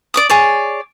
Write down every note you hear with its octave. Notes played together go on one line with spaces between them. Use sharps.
D5 D6 D#6
G#4 C#5 D5